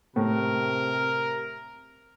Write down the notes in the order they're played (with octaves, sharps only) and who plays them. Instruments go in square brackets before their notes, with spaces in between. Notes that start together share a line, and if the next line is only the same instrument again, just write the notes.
[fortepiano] A2 [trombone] C3 [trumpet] A#4